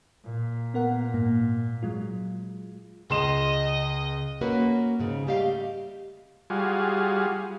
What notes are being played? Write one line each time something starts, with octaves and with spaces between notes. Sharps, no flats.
A#2
B3 A#4 F#5
G#2 A#3
F#3 G#3 F4
C#2 D#5 C6 E7
A#3 C#4 F#4 B4
G#2 C#3
G3 A3 G4 D#5 F5
G3 F4 F#4 G#4